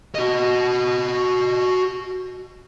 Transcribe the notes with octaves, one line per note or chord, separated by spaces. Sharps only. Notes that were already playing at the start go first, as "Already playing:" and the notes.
F#4 D#5